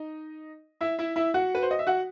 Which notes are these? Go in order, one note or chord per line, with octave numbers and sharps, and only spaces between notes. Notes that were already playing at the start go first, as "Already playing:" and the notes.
Already playing: D#4 D#5
E4 E5
E4 E5
E4 E5
F#4 F#5
B4
C5
D#5
E5
F#4 F#5